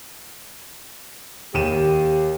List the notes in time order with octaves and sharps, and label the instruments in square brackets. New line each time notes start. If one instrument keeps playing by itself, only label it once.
[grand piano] D#2 D#7 E7 [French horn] G4